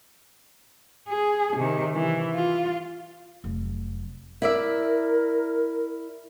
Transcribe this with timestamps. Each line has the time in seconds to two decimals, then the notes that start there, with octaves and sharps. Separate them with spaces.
1.09 G#4
1.56 C3 D#3
1.94 E3
2.35 F4
3.44 F1 F#3
4.42 E4 A#4 D5 E5